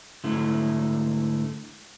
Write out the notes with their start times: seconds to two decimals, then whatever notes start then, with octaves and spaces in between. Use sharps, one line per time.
0.24 G#2 D3 A3 E4